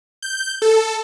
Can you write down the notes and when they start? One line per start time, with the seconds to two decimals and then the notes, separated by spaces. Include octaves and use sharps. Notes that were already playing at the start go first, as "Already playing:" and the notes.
0.22 G6
0.62 A4